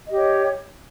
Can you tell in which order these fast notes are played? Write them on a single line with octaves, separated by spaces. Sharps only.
D#5 G4 C#5